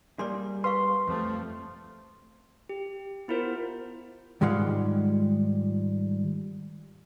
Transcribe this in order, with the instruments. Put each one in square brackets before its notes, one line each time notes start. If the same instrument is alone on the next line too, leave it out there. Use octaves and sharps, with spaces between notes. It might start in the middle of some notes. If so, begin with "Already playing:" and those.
[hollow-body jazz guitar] G3 A#3 G#4 [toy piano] D5 C6
[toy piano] B4 F5 C#6 [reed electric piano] C6
[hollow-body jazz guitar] F2 [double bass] F3 A3
[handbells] G4
B3 E4 F4 A#4 C5
[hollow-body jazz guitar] G#2 D#3 G3 G#3 F4 F#5